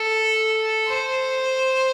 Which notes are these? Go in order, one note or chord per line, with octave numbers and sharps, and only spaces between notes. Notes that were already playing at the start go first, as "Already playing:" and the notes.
Already playing: A4
C5